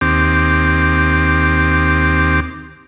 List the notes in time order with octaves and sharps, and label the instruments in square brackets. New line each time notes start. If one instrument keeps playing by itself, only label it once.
[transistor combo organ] D#2 C4 G4 D6